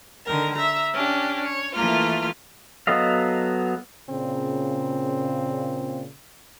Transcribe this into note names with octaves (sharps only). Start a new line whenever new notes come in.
D3 D#3 A#4
E5 A#5
C#4 D4 G4
C#5
E3 A3 A#3 F4 F6
F#3 B3 A4 D#5 F5
A#2 C#3 C4